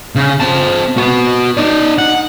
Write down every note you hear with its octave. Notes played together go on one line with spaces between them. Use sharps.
C#3
C4 A5
F#4 B4
D#4 D5
F#5